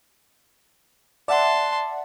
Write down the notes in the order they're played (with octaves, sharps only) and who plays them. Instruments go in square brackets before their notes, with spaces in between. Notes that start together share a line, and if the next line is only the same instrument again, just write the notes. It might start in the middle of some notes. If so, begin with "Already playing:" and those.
[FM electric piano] D5 E5 F#5 [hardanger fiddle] A5 C6